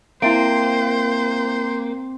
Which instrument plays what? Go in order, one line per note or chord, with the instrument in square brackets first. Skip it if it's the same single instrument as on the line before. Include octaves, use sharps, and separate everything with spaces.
[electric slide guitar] A#3 [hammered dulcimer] C4 [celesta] E4 E5 D7 [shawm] C5